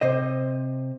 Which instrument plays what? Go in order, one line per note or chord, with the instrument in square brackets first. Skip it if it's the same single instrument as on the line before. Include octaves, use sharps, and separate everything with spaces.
[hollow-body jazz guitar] C3 C5 D#5